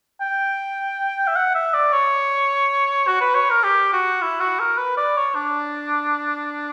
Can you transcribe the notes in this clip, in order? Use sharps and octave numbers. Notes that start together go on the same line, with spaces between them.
G5
E5
F#5
E5
D5
C#5
F#4
B4
C#5
A#4
G4
F#4
E4
F#4
A#4
B4
D5
C#5
D4